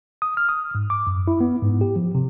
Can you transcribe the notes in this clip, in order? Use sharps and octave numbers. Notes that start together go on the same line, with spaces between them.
D#6
F6
D#6
G#2
D6
F#2
E4
B3
G#2
G4
F3
C3